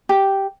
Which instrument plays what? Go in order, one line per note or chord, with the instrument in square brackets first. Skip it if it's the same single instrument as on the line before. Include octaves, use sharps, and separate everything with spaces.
[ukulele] G4